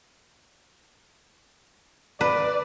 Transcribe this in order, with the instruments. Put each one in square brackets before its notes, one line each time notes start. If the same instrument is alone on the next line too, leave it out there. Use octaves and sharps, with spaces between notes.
[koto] B4 [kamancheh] D5